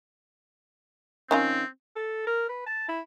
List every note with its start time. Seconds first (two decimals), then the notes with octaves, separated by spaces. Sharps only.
1.31 D#3 C4 C#4 F4
1.96 A4
2.27 A#4
2.49 B4
2.67 A5
2.88 E4